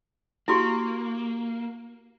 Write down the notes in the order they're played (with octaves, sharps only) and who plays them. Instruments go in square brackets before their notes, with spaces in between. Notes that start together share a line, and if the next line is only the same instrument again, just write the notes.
[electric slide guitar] A#3 [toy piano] E4 F#4 G4